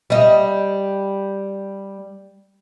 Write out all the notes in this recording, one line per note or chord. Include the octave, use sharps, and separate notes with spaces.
G3 D#5